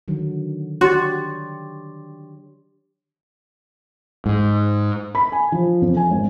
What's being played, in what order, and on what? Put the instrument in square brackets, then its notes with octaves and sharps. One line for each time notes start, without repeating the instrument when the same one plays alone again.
[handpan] D3 D#3 F#3
[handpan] D4 G4 C#5 [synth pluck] F#4 [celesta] C6 A6
[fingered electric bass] G#2
[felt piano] B5
G#5
F3
F2
G#5
G#1